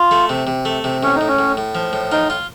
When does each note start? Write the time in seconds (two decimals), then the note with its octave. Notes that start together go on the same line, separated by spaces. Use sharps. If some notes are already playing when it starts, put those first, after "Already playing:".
Already playing: F4
0.11 A3
0.29 C3
0.47 C3
0.65 A3
0.84 C3
1.03 A2 C#4
1.15 D#4
1.21 A2
1.28 C#4
1.39 A2
1.57 A2
1.75 F3
1.93 A2
2.12 D#4 F4
2.30 F4